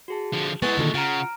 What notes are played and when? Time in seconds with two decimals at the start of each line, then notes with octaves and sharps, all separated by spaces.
0.08 F#4 G#4 A5
0.33 D3 F3
0.62 G#3 B3 E4 A4 G#5 C#6 A6
0.78 A#2 D3 D#3
0.94 C#3 F4 F#5 A#5 F6 D7